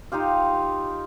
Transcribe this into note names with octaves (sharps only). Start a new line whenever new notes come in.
D#4 F4 G4 F5